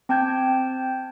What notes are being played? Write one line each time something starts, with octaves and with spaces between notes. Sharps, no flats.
C4 G5 A5 G6 G#6